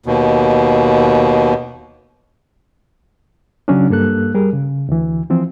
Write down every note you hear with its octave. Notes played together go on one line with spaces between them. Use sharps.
D#2 B2
C#3 F#3 C#4 D4
G2 A#3 A4 F#6
G3 G#4 A#4
C#3
D2 E3
E3 F3 C4